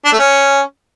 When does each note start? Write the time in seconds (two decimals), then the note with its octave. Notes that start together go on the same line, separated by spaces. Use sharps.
0.05 D4
0.12 A3
0.19 C#4